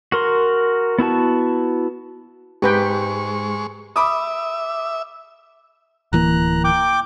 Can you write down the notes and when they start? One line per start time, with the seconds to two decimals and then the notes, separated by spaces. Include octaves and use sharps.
0.12 F#4 A#4 C6
0.98 B3 E4 F#4 A5
2.62 G#2 G#3 G4 B4 G5 C#6
3.96 E5 B5 D6 D#6
6.13 D1 E3 A#3 A#5 F#6
6.64 G5 D6